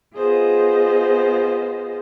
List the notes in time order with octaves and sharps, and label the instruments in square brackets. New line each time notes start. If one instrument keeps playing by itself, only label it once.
[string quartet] B3 F4 G#4 C5 D#5